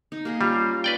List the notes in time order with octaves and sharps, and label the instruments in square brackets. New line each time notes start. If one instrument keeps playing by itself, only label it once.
[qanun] D#4
A#3 G#4 D#5
[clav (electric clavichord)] G3 [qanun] C#4 F4 G4
[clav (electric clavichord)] B4 D5 G5